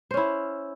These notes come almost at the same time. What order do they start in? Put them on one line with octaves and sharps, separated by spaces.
C5 C#4 E4